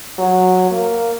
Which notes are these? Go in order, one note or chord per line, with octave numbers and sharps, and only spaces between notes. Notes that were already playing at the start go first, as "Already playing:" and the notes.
F#3
A#3